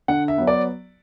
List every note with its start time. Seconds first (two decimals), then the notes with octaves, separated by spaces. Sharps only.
0.08 D3 F#5
0.28 E5
0.38 F#3 B3
0.47 D5